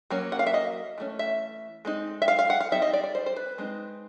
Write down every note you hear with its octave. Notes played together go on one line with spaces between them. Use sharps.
F#3 A#3 C#4
F#5
F5
E5
D#5
E3 A3 C#4
E5
G#3 C4 D#4
E5
F5
F5
F#5
F5
G3 C4 D#4 E5
D#5
D5
D5
C5
C5
B4
G#3 C4 D#4